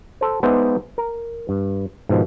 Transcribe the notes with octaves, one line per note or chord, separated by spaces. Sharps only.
A4 C5
G#3 B3 D#4 C5 D5 E5
A#4
G2
G#2 B2 D#3 F3